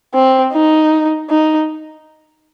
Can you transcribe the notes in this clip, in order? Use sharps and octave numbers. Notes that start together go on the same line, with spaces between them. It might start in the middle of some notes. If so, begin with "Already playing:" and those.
C4
D#4
D#4